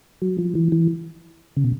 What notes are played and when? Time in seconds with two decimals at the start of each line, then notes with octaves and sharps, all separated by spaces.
0.22 F#3
0.38 F3
0.55 E3
0.72 E3
1.56 C#3
1.64 B2